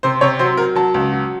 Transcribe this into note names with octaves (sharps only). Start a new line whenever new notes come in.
C3 C5
C3 C#5
F#3 C5
F#3 A#4
F#3 A5
C#2
F#3